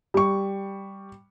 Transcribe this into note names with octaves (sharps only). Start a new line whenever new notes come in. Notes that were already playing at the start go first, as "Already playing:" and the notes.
G3 C#6